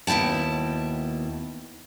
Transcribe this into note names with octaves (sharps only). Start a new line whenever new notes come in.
D#2 B2 E4 G5 A5